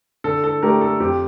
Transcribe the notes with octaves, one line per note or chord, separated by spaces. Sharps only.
D3 A4
A4
A3 D4 G4 A#4
A4
F2 G4